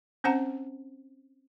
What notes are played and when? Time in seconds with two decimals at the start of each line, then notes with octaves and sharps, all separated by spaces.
0.24 C4 C#4 C5 F#5 A5 A#5